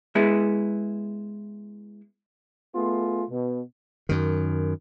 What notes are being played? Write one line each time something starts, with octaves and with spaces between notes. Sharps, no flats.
G#3 B3 E4 G#4
A3 B3 F4 G#4 C6
B2
F#2 D#3